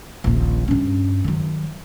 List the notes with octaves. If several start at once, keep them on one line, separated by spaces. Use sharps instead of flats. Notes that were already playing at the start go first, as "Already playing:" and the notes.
D#1 A#1
G2 C#4
D#3 F#3